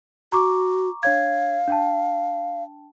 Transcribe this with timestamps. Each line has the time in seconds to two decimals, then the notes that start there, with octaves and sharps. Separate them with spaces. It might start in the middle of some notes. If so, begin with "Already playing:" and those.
0.32 F#4 A#5 C#6 D6
1.03 D4 C#5 F5 G#6
1.68 D4 G5 A5